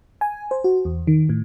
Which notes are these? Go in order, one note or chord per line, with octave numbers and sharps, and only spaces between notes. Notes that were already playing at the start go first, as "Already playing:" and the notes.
G#5
C5
F#4
E2
D#3
A2